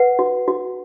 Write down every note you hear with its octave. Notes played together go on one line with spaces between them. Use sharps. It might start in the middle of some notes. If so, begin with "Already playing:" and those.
Already playing: B4 F#5
F#4
F#4